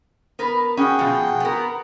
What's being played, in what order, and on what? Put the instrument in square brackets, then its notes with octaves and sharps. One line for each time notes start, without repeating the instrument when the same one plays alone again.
[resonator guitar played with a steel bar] B3 A#4 B4
[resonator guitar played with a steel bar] C#4 [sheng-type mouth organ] F#4 G#4 G5
[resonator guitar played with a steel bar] B2 F3
B3 A#4